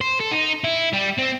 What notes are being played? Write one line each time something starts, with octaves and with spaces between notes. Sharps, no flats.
C5
A4
D#4
E4
G3
C4